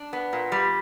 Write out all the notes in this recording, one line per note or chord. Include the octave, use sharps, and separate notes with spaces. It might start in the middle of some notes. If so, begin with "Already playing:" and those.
Already playing: D4
B3
A#2
G3